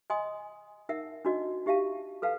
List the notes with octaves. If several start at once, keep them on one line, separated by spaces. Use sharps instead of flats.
D#5 G#5 C6 D#6
D#4 A#4 E5 F#5
D4 D#4 F#4 D5 D#5
D#4 G4 E5 F5 A5
A4 B4 F5 F#5 A5